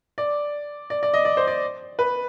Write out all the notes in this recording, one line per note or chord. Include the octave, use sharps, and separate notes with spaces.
D5
D5
D5
D#5
D5
C5
D5
B4